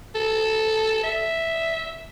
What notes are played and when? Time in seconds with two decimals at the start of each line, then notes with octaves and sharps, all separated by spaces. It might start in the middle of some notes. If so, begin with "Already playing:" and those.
0.15 A4
1.03 E5